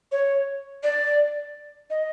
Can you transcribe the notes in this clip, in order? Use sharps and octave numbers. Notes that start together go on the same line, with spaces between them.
C#5
D5
D#5